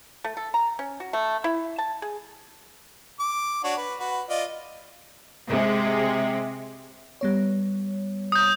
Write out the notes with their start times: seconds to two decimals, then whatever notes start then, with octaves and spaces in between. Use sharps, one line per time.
0.24 A3
0.37 A4
0.54 A#5
0.79 C#4
1.00 F#4
1.13 A3
1.44 E4
1.78 A5
2.02 G#4
3.20 D6
3.64 D4 F#4 C#5
3.77 B4
4.00 F#4 B4
4.29 F4 D5 D#5
5.48 C3 G#3
7.21 G3 B3 C#5
8.32 D#6 G6